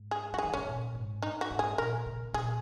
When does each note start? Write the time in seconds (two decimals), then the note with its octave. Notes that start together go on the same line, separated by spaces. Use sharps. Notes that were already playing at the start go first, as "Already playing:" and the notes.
Already playing: G#2
0.11 G#4
0.33 F#3 F#4
0.38 G#4
0.44 D#3
0.54 C#3 C#4
0.67 A#2
0.95 G#2
1.22 D#4
1.41 F#4
1.51 G#2
1.59 G#4
1.78 A#2 A#4
2.06 C#3
2.34 A#2 G#4